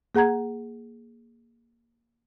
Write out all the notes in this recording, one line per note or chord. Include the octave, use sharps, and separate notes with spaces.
A#3 G#4 F#5 A#5 G#6